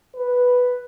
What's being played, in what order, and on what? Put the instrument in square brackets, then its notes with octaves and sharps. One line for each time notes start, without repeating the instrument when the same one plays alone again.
[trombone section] B4